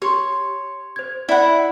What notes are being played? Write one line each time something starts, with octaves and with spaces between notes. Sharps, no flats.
G4 C#5 C6
C5 G#6
E4 D5 E5 F#5 B5